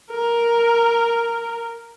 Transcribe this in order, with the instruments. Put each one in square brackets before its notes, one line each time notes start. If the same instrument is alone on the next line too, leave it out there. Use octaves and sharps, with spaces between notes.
[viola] A#4